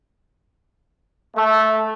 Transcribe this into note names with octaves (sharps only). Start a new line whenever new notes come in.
A3